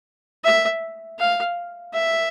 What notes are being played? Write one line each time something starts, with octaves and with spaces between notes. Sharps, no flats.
E5
F5
E5